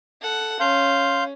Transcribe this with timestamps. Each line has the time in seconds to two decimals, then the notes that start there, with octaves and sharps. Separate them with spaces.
0.21 A4 F#5
0.60 C#4 F5 C6 G6